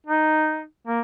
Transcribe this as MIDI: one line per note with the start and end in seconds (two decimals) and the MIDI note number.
0.07 0.64 63
0.87 1.01 58